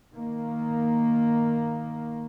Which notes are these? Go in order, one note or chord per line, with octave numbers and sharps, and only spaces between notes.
D#3 A#3